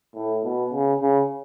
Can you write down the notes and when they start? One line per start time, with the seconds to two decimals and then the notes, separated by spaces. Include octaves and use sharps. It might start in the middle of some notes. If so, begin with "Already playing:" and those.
0.15 A2
0.44 B2
0.73 C#3
1.01 C#3